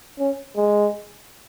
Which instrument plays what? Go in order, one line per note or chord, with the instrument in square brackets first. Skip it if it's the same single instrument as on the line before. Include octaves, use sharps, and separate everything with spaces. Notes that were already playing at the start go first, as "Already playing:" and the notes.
[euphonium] C#4
G#3